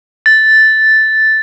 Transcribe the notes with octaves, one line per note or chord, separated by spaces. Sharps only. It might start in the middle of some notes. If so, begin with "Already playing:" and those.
A6